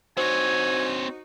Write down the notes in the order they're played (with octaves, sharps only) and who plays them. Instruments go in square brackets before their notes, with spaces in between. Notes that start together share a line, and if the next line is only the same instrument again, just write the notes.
[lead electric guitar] C4 C#5 [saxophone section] D#4 F#4 [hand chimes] C5 [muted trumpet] G#5